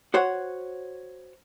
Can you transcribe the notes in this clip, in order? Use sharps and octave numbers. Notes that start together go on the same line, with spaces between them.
F#4 C5 C#5 F#5